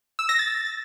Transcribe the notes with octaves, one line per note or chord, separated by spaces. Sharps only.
E6
A#6
A6